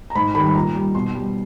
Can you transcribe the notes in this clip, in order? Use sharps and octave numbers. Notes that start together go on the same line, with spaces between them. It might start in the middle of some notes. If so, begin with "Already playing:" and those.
A#5
G#2 B5
D#3 G3 B5
B5
A#2 A#5
G3
B2 C6
G3